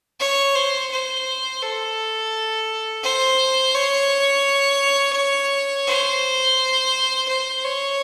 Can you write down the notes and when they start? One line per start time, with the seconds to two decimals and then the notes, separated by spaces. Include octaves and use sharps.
0.20 C#5
0.55 C5
0.91 C5
1.62 A4
3.04 C5
3.74 C#5
5.87 C5
7.28 C5
7.64 C#5